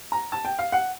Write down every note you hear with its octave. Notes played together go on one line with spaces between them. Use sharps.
A#5
A5
G5
F5
F#5